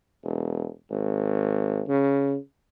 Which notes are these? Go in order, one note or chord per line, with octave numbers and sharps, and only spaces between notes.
E1
G#1
C#3